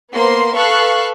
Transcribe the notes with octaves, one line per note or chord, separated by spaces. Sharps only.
A#3 B3 C5 C6
A4 B4 F5 C#6 F#6